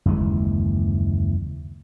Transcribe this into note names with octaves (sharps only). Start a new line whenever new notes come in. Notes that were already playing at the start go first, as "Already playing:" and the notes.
F#1 D#2 E3 G#3